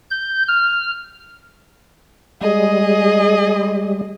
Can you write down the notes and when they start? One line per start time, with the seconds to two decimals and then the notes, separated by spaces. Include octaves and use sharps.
0.11 G6
0.48 F6
2.41 G3 G#3 G#4 D#5